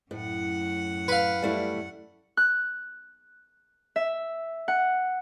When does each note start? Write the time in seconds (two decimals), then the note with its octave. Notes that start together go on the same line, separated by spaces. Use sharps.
0.11 F#2 A2 F#5
1.08 B4 F5
1.42 G3 A3 E4
2.37 F#6
3.96 E5
4.68 F#5